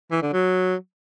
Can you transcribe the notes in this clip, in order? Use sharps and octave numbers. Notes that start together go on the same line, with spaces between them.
E3
D3
F#3